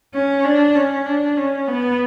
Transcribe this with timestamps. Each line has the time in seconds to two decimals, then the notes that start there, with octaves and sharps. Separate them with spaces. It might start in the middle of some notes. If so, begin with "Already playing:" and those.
0.14 C#4
0.44 D4
0.75 C#4
1.06 D4
1.37 C#4
1.67 B3